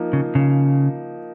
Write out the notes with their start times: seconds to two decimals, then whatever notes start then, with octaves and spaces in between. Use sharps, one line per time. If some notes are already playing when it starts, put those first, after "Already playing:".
Already playing: F3 A#3 D#4
0.13 C#3
0.35 C#3